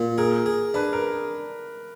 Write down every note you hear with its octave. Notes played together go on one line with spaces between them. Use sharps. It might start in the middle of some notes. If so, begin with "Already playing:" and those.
Already playing: A#2
G#4 A#4
G#4
D4 B4
A#4